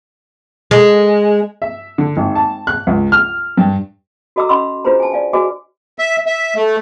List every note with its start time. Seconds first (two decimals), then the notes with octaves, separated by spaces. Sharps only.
0.71 G#3
1.62 E5
1.98 D3
2.17 G#1
2.36 A5
2.67 F#6
2.87 C#2
3.12 F6
3.57 G2
4.36 F#4 A4 D#5 A#5 D6 E6
4.49 C#4 D#5 F#5 B5 C6 E6
4.84 D4 F4 G#4 B4 C5 A#5
5.00 G#5 A5
5.12 D5 F5 G#5
5.33 F#4 G#4 B4 D#5 G#5 D6
5.99 E5
6.26 E5
6.56 A3